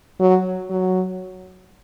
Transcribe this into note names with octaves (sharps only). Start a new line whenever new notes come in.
F#3
F#3